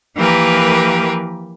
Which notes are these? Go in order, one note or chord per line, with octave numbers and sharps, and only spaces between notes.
E3 F3 A#3 G4 A#4 B4